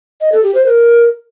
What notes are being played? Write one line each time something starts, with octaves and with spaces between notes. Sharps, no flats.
D#5
A4
G4
C5
A#4